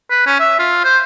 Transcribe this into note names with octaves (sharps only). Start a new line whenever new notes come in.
B4
C#4
E5
F4
C5